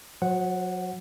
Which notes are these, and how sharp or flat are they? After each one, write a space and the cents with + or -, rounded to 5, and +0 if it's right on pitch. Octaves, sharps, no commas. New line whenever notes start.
F#3 -25 C5 +15 F#5 +0